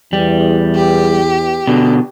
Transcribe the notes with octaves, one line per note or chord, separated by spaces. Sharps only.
E2 G3
G4
B2 D3